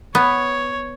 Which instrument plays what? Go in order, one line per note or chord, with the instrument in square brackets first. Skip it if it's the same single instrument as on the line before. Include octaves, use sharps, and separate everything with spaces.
[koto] B3 [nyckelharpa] C#5